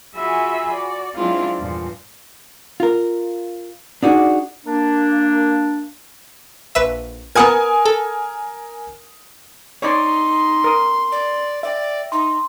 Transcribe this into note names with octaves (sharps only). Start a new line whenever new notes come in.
F4 F#4 G#4 E5 G#5 B5
F#4 D5
F#3 G#3 C4 D4 E4 F4
E2 G2 A#2 F3
F4 A#4
D4 D#4 F#4 G#4 D5
A#3 D4
A#1 B4 E5
B3 A#4 F#5 G#5 D#6 G#6
A4
D#4 C#5 D5 C6
A#4 D#6
D5
D5 E5 G5
D#4 C6